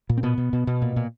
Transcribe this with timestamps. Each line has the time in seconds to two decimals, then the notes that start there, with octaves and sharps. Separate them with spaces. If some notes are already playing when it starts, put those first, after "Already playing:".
0.09 A#2
0.17 C4
0.23 B2 B3
0.38 B2
0.53 B2
0.67 B2
0.82 A#2
0.96 A#2